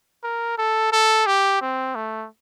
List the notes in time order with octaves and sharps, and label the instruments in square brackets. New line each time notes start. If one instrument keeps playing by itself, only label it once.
[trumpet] A#4
A4
A4
G4
C4
A3